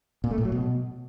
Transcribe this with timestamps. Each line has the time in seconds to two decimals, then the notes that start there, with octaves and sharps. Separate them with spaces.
0.24 A#2
0.31 A3
0.38 A2
0.45 F#3
0.52 B2